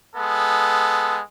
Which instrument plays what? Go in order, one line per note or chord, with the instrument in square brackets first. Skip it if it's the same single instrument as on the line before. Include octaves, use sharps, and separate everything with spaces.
[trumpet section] G#3 B3 A4